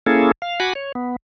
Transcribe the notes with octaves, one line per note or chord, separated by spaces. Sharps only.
A#3 C#4 E4 G#4 A4
F5
F#4 F#5 G#5 B5 D6
C#5
B3